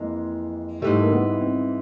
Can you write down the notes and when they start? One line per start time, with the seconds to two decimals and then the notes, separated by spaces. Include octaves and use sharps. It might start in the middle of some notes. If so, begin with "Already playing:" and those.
Already playing: F2 E3 G#3 A#3
0.82 G#2 E3 G3 A3
1.01 A#3
1.11 B3
1.41 C4